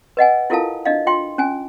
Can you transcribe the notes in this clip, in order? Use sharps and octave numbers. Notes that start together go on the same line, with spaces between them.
B4 D#5 F#5 G#5
E4 F4 A4 A#4 F5 A5
D4 D#5 F5
F4 G5 C6
C#4 G#5